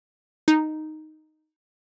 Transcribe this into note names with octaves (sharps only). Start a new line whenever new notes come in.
D#4